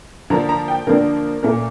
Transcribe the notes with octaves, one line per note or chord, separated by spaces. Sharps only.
D3 F3 A#3 D4 A#5
A#5
G5
D3 F3 A#3 D4 A#4
A#2 A3 C#4 A#4